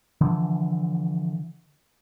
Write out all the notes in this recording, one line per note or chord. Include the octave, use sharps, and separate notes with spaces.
D3 E3 F3